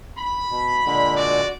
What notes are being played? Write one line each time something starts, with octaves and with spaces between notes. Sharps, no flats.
B5
B2
A#2 D3 G#3
F#4 D5